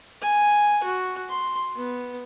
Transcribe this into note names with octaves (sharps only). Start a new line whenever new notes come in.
G#5
F#4
C6
B3